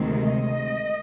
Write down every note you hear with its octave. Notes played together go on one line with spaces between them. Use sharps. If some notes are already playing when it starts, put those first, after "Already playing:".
Already playing: D2 C3 D#3 G#3
D#5